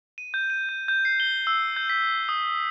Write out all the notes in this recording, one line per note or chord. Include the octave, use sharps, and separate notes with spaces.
D#7
G6
D#7
G6
G6
C7
G7
E6
G6
B6
D#6